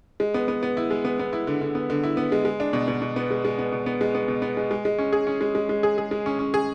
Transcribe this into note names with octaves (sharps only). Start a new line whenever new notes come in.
G#3
B3
B3
B3
E4
G#3
B3
B3
E4
D3
D3
B3
D3
E4
B3
G#3
G#3
D4
B2
B2
B2
B3
G#3
G#3
B3
B2
B3
G#3
B3
B2
B3
G#3
G#3
G#3
C#4
G#4
C#4
G#3
G#3
G#3
G#4
G#4
G#3
C#4
C#4
G#4